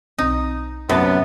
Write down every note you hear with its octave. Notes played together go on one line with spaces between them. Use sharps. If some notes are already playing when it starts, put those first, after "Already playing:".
B1 C4 D#4
F#2 C3 A3 B3 A5 A6